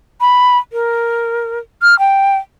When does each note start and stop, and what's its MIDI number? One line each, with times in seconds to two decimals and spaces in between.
0.21 0.58 83
0.72 1.59 70
1.82 1.97 89
1.99 2.36 79